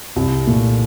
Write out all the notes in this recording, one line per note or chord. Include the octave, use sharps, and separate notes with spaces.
C2
A#2 A3